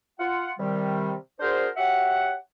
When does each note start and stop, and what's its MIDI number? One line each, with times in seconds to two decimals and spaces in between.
0.20 0.51 65
0.20 0.51 78
0.60 1.14 48
0.60 1.14 51
0.60 1.14 55
1.40 1.68 62
1.40 1.68 66
1.40 1.68 68
1.40 1.68 70
1.40 1.68 72
1.77 2.34 66
1.77 2.34 67
1.77 2.34 73
1.77 2.34 76
1.77 2.34 78